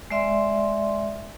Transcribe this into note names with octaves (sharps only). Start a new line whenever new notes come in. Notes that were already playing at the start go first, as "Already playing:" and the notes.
G#3 D5 E5 C6